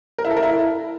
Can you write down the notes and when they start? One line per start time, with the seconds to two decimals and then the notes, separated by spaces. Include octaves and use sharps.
0.18 A#4
0.24 E4
0.30 A4
0.37 A#4
0.43 E4